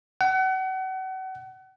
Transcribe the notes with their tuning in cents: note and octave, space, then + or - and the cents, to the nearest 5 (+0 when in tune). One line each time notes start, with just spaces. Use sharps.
F#5 +35